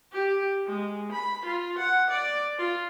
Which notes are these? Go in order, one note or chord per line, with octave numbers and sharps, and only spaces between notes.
G4
G#3
B5
F4
F#5
D5
F4